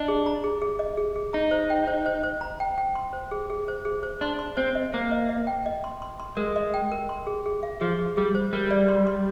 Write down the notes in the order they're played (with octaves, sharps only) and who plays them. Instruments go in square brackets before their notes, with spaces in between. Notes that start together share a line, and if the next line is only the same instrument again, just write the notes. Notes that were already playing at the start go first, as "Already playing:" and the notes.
Already playing: [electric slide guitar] D4 [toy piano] D#5
[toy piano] G#4
A#5
G#4
G#4
D#5
G#4
G#4
[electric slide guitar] D#4 [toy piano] A#5
[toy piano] C5
G5
C5
C5
C5
A#5
G5
G5
C6
C5
G#4
G#4
C5
G#4
C5
[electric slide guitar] D4 [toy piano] C6
[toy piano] C6
[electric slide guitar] C4 [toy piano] C5
[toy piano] D#5
[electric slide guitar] A#3 [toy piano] C5
[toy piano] D#5
D#5
G5
D#5
C6
C6
C6
[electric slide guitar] G#3 [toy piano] A#4
[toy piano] D#5
G5
A#4
C6
G#4
G#4
F5
[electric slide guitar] F3 [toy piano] G#4
[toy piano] G#4
[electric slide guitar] G3 [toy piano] G#4
[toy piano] C5
[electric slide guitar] G3 [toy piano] A#4
[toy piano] D5
C6
C6